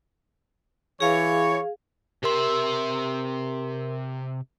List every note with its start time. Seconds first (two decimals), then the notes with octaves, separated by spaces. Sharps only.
1.00 E3 G#4 C#5 F5
2.23 C3 G4 A#4 E5 C6